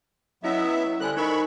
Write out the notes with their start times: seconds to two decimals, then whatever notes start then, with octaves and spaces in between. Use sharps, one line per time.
0.44 F#3 B3 C#4 E4 D#5 E5
1.00 D3 G3 A4 C5 G#5 F#6
1.17 D#4 A#4 D#5 B5 C#6